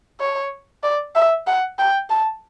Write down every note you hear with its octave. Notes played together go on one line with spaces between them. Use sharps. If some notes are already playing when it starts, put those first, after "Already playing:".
C#5
D5
E5
F#5
G5
A5